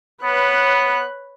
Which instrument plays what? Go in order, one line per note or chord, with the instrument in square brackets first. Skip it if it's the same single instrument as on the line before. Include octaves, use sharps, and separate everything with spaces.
[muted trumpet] B3 [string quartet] B4 C#5 F#6